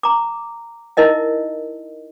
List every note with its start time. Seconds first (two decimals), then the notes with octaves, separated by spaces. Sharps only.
0.03 A#5 D6
0.97 D#4 E4 A#4 D#5 E5